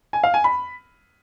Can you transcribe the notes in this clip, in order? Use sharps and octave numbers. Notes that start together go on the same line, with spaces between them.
G#5
F5
G#5
B5